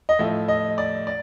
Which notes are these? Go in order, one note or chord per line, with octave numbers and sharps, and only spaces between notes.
D#5
A2 F3 A3 E5
D#5
D5
D5